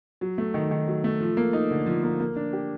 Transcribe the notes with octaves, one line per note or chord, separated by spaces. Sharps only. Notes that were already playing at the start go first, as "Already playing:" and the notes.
F#3
A3
D#3
D#3
F#3
A3
F3
A#3
D#4
D3
F3
A#3
A#3
D4
G4